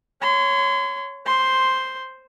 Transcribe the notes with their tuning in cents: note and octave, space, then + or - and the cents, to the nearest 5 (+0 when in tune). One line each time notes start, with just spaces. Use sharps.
C#5 +0 C6 -35
C5 +0 C6 +0